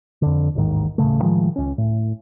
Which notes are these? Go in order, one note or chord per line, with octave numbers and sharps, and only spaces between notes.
F2 D3
A1 D#2 G#2 D#3
D#1 A1 C#3 A3
A2 D#3 F3 G#3
C#2 C#4
A2